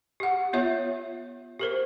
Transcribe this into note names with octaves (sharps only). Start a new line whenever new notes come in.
G4 F#5
B3 F4 C#5 E5
G4 A#4 C5